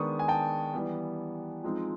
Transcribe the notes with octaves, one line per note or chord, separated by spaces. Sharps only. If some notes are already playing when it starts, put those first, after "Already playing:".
Already playing: D#3 G#3 B3 D4 C#6 D#6
G#5
G5 A5
E3 G3 B3
F3 G#3 C4 D#4